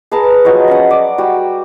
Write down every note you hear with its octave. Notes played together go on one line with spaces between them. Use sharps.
G#4 B4 A5 A#5
F3 F#3 D#5 C#6
C#4 D#5 F#5
D5
G3 F#4